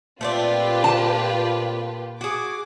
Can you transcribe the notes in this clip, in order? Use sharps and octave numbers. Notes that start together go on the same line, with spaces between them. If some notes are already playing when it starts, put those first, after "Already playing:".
A#2 A3 C4 D4 F4 G4 B4
A5
F#4 G#4 D6